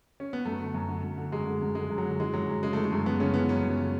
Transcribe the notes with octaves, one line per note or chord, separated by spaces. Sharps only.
C#4
B3
F#2 A3
D3
F#2
D3
F#2
D3
F#2 G#3
D3
F#2
D3 G#3
F#2
F#3
D3
E3 G#3
F#2 F#3
F#2
C#3 G#3
E3 A3
G#3
F#2
F#2 B3
C#3 C#4
E3 B3
F#2 C#4
F#2
C#3